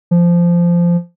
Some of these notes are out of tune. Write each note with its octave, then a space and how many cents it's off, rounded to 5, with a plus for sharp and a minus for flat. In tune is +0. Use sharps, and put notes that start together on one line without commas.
F3 -15